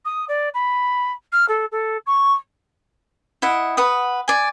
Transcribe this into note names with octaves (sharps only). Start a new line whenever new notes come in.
D#6
D5
B5
F6
A4
A4
C#6
E4 D#5 F#5
B4 F#5 D#6
D5 G#5